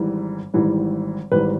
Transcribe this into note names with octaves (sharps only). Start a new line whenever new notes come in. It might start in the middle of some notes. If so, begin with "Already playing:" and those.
Already playing: G#1 G#2 E3 G3
G#1 G#2 E3 G3
G#1 G#2 E3 G3 B4